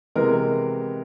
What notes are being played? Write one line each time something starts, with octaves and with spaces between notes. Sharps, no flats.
C3 E3 G#3 B3 A#4